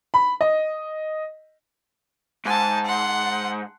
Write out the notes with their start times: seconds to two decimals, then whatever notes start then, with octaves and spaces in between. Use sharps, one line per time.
0.14 B5
0.41 D#5
2.45 G#2 G#5 A5
2.85 F#5 C6